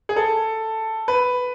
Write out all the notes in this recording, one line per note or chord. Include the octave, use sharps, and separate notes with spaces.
G#4
A4
B4